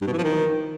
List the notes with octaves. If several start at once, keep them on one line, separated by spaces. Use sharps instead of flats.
G2
B2
E3
F3
D#3